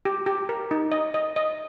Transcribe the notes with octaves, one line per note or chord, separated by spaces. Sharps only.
G4
G4
A#4
D#4
D#5
D#5
D#5